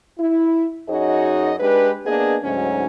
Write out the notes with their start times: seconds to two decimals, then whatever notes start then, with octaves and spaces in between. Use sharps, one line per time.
0.19 E4
0.88 F#2 D#4 F#4 G#4 C#5 D#5
1.60 G#3 D4 G4 B4
2.05 A#3 B3 D4 G#4 D#5
2.43 D2 G#2 F#3 C#4 D#4 C5